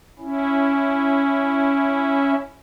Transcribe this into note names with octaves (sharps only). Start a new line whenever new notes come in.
C#4 E4